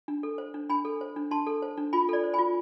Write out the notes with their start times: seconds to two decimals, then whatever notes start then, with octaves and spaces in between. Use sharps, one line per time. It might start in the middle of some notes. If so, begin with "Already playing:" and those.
0.08 D4
0.23 A4
0.38 C5
0.54 D4
0.69 D4 G#5 B5
0.85 A4
1.01 C5
1.16 D4
1.31 D4 A5 C6
1.47 A4
1.62 C5
1.77 D4
1.93 F4 G#5 B5
2.09 A4 D5
2.24 C5
2.33 G#5 B5
2.39 F4